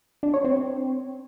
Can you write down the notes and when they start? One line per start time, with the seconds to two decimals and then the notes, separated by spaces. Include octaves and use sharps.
0.23 D4
0.34 C#5
0.44 C4